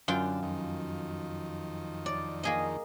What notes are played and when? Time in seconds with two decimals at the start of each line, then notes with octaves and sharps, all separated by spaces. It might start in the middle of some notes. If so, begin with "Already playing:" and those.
0.08 F#2 D3 F4 G5
0.43 F2 D#3
2.06 D5
2.43 A#3 G#4 D#5